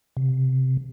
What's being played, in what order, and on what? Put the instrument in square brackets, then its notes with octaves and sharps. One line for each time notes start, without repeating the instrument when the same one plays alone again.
[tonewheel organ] C3